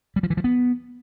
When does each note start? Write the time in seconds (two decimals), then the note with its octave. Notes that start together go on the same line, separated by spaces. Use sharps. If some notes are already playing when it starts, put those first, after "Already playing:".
0.16 G3
0.23 F3
0.30 E3
0.37 F3
0.44 B3